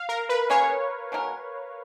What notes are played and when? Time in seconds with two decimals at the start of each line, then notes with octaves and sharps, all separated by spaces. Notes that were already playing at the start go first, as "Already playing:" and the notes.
Already playing: F5
0.09 A#4
0.29 B4
0.50 A#3 C#4 G#4 C#5
1.12 B2 G#3 D#4 A#4